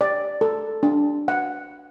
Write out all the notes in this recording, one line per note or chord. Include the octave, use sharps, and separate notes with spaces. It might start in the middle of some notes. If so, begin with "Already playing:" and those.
D5
A4
D4
F#5